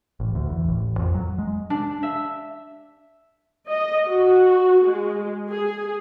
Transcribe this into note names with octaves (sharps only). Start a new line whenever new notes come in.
A1
D2
E2
A1
F2
F#3
G#3
D4
E5
D#5
F#4
G#3
G#4